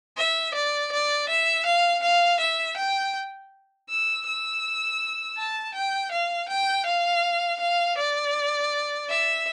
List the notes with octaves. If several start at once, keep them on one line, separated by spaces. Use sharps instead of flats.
E5
D5
D5
E5
F5
F5
E5
G5
E6
E6
A5
G5
F5
G5
F5
F5
D5
E5